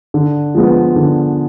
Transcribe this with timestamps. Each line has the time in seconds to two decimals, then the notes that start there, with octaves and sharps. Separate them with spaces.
0.14 D3
0.55 F3 G#3 B3
0.96 D3